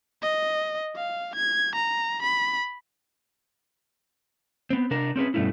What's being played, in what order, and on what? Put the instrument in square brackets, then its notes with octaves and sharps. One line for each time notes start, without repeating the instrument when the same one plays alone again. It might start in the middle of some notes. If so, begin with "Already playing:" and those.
[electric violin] D#5
F5
G#6
A#5
B5
[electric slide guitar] B3 C4
C3 D4 A#4
C4 C#4 G#4 B4
G2 B2 G3 A3 C#4 E4